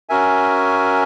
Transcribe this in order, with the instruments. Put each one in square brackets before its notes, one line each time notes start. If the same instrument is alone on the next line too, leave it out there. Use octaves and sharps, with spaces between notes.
[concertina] C#4 F#4 A#4 E5 G#5